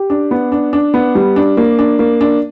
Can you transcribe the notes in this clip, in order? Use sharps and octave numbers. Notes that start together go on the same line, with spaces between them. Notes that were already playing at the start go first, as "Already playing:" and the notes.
Already playing: G4
D4
B3
D4
D4
B3
G3
D4
A#3
D4
A#3
D4